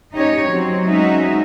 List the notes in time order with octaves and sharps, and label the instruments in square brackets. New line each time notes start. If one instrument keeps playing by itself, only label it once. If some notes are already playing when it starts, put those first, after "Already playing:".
[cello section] C#4 D#4 G4 C#5
F#3 C4
G#3 C#4 D#4 F#4 E5